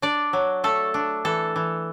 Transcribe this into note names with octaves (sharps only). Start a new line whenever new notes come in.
D4 D5
F#3
A3 A4
D4
E3 A4
E3